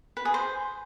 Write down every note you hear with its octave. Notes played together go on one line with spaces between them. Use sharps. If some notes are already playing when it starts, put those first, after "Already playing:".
B4
G#4
C5